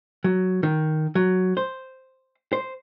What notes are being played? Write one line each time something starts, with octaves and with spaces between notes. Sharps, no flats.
F#3
D#3
F#3
C5
C5